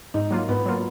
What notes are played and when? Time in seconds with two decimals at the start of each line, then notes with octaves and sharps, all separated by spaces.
0.14 G#2 D#4
0.31 F#3 A#3 F4
0.49 G#2 B3
0.66 F#3 A#3 F4